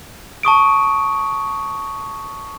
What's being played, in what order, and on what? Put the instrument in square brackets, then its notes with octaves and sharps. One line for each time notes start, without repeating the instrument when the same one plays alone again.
[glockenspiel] A5 C#6 D#6 D7